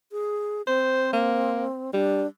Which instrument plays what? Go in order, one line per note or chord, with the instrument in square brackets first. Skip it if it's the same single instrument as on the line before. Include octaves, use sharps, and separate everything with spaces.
[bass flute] G#4
[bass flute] C4 [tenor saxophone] C5
[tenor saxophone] A#3
[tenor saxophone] G3 [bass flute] D4